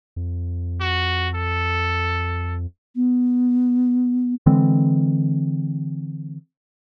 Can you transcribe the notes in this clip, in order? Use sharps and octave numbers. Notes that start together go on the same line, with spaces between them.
F2
F#4
A4
B3
D3 E3 G#3 C4